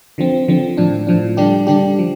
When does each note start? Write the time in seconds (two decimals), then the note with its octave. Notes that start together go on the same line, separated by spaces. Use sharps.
0.18 D3 F3 C4
0.48 D3 F3 C4
0.77 A2 F3 D4
1.07 A2 F3 D4
1.37 D3 G3 D4 G4
1.67 D3 G3 D4 G4
1.99 F3